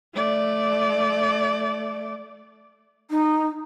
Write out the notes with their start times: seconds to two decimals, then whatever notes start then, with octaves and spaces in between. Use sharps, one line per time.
0.15 A3 D5
3.10 D#4